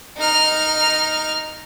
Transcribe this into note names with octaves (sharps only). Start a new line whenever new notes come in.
D#4 F6